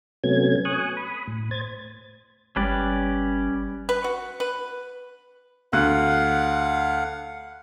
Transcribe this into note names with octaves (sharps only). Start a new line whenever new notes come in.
C3 F#3 A3 B3 C#4 G#6
G#5 C#6 D#6 F#6
B5 D#6
A2
C5 G#6 A6
G1 G3 C#4 B4 D5
B4
F#4
B4
D2 F5 F#5 F#6